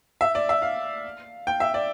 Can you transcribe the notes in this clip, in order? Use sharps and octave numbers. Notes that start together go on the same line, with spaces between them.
E5
D5
E5
F5
G5
E5
D5